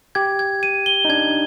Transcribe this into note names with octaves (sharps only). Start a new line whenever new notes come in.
G4 G#6
G#6
D#7
G7
D#4
D4 G#6